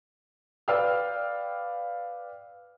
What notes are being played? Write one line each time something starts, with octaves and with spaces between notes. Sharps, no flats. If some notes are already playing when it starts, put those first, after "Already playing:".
B4 D5 F5 G5 E6 F6